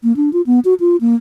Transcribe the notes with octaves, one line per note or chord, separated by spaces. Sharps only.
A#3
D4
F4
B3
F#4
F4
A#3